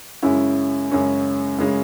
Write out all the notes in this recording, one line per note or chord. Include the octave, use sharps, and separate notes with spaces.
F#2 C#3 G#3 C#4 E4
F#2 C#3 G#3 C#4
F#2 C#3 G#3 C#4